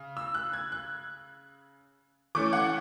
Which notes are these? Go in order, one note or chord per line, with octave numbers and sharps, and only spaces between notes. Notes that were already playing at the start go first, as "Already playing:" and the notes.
Already playing: C#3
E6
F#6
G#6
F#6
E3 A3 C#4 D6
F#5